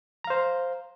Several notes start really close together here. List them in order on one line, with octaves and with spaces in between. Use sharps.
A#5 F5 C5